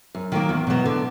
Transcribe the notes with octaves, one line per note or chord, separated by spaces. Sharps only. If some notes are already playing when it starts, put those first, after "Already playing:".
F#2
D#3 F#3 A#3
E2
B2 F#3 B3
D3